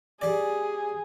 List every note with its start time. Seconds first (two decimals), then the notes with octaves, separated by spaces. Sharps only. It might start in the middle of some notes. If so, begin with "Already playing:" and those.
0.21 G3 G#4 D5